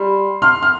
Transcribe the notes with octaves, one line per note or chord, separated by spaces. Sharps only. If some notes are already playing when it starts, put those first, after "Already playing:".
Already playing: G3 C6
C6 F6
F6